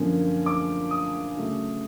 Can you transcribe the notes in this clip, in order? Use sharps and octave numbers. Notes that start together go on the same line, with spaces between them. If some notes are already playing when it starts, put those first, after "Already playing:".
Already playing: F#2 D3 F3 A#3 C#4
D6
D#6
C#3 F#3 A3